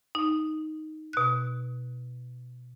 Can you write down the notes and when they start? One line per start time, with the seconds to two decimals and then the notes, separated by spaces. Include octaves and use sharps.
0.15 D#4
1.13 B2 F#6